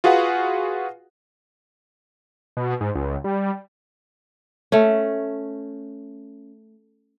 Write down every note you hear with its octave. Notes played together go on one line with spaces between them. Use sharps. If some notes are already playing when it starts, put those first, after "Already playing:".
F4 F#4 G#4 B4 F5 F#5
B2
G#2
C#2
G3
A3 C#4